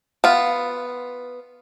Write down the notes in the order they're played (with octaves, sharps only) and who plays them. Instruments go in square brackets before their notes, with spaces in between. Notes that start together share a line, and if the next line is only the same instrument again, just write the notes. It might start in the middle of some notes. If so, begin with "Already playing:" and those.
[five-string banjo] B3 F4